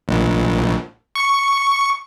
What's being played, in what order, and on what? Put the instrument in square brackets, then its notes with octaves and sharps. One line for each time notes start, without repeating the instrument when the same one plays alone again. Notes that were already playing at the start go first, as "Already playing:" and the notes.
[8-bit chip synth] A#1
C#6